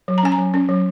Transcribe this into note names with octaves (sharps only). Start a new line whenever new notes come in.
F#3
A#5
C#4 G#5
A#5
F#3
C#4
F#3